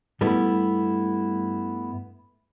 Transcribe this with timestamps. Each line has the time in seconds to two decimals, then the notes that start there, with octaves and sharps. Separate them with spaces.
0.21 G2 G3 A3 B3 E4